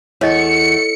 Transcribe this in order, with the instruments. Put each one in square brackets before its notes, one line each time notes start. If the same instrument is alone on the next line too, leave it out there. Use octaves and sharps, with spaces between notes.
[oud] E2 [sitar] A3 [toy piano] C#5 D#5 [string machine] C#7